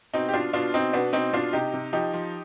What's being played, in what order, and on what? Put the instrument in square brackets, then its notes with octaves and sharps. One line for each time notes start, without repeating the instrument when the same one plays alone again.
[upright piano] B2 C4 D#4
G4
B2 D4 F4
B2 D4 F4
B2 C4 D#4
B2 B3 D4
B2 C4 D#4
B2 D4 F4
C3 D#4 G4
C3
F3 D#4 G4
F3